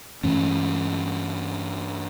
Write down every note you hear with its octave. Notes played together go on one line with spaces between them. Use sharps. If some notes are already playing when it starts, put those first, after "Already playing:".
G2 E3 A3 C#4